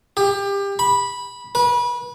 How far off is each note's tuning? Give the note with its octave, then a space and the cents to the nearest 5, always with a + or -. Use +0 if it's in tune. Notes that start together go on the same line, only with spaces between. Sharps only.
G4 +25
B5 -10
B4 -30